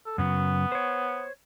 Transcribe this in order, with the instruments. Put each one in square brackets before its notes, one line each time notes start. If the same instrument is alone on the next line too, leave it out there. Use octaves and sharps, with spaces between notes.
[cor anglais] A4
[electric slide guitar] F#2 C#3 F#3 [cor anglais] B3
[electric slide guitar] C5 C#5